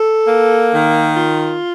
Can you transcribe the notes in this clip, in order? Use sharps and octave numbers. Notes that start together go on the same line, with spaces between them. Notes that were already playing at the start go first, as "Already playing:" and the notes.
Already playing: A4
A#3
D#3
F4